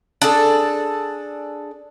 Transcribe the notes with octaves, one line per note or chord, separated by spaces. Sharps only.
D4 G#4 A4